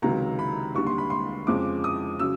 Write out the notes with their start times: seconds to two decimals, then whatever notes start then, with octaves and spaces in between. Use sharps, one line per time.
0.02 C#2 C3 D#3 F#3 A#5
0.39 B5
0.75 D#2 D3 G3 C#6
0.87 C6
0.98 B5
1.10 C6
1.47 F2 C#3 F3 G#3 D6
1.84 D#6
2.19 C#3 F#3 E6